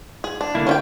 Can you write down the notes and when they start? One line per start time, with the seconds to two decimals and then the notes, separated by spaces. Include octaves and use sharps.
0.24 G#4
0.41 D4
0.55 D3 A#3 E4
0.67 C#4 C#5 G5